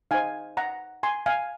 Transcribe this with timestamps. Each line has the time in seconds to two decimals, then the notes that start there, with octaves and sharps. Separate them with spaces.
0.11 D#4 G#4 C5 F5 G#5
0.57 F#5 A#5
1.03 G#5 C6
1.26 F5 G#5